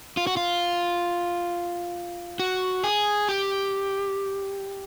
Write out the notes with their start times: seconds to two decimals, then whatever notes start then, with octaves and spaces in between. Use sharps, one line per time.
0.17 F4
0.27 F#4
0.37 F4
2.40 F#4
2.84 G#4
3.29 G4